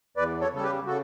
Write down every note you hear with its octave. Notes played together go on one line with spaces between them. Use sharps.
E2 B4 D5
A4 C#5
C#3 G3 A4
G4 B4
C#3 F#4 A4